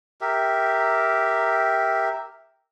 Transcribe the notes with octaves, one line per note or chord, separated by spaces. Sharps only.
G4 A#4 E5